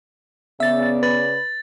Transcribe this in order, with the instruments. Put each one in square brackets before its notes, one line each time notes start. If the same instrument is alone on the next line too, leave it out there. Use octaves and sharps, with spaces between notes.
[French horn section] C#3 D5 [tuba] B3 [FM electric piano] E5 A6
[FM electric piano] B4 [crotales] A6